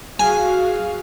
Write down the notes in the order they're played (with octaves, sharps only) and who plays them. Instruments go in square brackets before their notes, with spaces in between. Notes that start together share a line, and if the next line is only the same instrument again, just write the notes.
[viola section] F#4 G#4 F5 [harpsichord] G#5